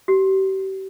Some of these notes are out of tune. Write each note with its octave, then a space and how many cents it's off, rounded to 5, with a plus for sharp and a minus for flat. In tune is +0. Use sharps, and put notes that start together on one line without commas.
G4 -35